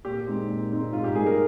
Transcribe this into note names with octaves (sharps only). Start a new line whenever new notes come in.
A#2 G4
G#3 C4 D#4
A#2
G#3 C4 D#4
G#2 F4
G4
G3 A#3 D#4 G#4
A#4